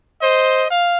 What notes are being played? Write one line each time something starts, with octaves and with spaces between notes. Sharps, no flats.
C5 D#5
F5